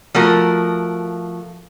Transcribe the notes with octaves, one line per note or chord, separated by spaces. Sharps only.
F3 A3 F#4 A#4